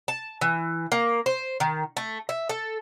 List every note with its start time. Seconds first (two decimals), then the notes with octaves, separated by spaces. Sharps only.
0.08 A5
0.41 E3
0.92 A#3
1.26 C5
1.60 D#3
1.97 A3
2.29 E5
2.49 A4